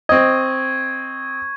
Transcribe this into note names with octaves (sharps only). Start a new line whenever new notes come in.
C4 D#5 C#6 G#6